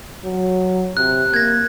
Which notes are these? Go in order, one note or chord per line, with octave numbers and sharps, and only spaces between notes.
F#3
C3 F#6
A#3 G#6 A#6